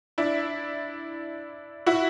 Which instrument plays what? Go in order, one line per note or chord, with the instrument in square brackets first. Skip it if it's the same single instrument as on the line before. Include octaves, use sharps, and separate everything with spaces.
[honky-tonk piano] D4 E4
E4 F#4